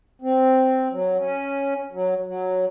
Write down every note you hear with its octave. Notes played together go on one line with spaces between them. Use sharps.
C4
F#3
C#4
F#3
F#3